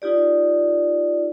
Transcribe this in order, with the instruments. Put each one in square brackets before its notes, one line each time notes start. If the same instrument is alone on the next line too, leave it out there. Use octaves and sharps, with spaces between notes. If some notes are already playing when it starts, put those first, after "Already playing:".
[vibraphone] D#4 F4 G4 D5